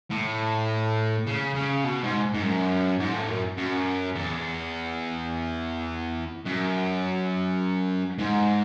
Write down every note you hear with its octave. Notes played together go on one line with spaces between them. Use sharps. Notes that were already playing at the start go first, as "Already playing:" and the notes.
A2
C#3
C#3
B2
G#2
G#2
F#2
G#2
A2
F#2
F#2
E2
F#2
G#2